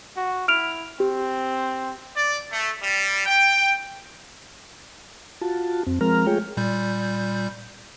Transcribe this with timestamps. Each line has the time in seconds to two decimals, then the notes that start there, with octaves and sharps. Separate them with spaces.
0.16 F#4
0.48 E4 F6 D7 F7
1.00 C4 G4
2.15 D5
2.51 A3
2.81 G3
3.26 G5
5.41 F4 F#4 A5
5.87 F2 C4
6.01 F3 G#3 C4 A#4 A#5 F6
6.27 G#3 A3 F4 G#4 C#5 G5
6.57 A#2 G3 G6